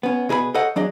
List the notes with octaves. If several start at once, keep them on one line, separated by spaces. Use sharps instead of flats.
B3 C#4
B2 G#4 B4 D#5 B5
A4 C5 C#5 D#5 F#5
F#3 D4 G#4 D#5